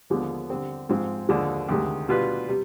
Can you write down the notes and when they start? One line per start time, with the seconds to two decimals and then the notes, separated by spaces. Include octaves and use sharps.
0.10 D#2 D3 F3 G#3 B3
0.50 D3 G3 C4
0.89 G#2 F3 C4
1.29 D#2 D3 F3 G#3 D4
1.69 D2 C3 D#3 G#3
2.09 B2 G3 D4 F4 B4
2.48 C3 G3